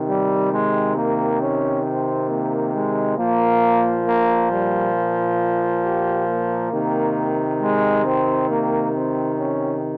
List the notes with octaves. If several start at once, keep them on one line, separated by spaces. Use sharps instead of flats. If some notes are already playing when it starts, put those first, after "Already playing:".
Already playing: C3 D#3
G3
G#3
A#3
C#4
C4
A#3
G#3
A#2 F3 A#3
A#3
G3
G4
A#3
C3 D#3
G#3
C4
A#3
C4
C#4